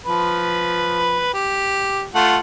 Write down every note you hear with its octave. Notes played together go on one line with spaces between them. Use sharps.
F3 B4
G4
A3 F4 F#5